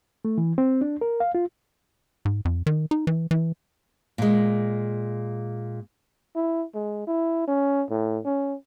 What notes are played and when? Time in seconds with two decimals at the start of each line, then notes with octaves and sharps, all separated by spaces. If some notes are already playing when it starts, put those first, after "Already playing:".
0.25 A3
0.38 E3
0.58 C4
0.81 D4
1.01 A#4
1.20 F5
1.35 F4
2.25 G#2
2.45 F2
2.66 D#3
2.91 D#4
3.07 E3
3.31 E3
4.18 A#2 G#3
6.35 E4
6.74 G#3
7.07 E4
7.47 C#4
7.90 A2
8.25 C#4